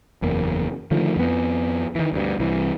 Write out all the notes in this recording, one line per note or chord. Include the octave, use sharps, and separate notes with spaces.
F#1 E2 A#3
D3 D#3 F3 A3
F2 B3
D#3 E3
D2 G2
C2 E3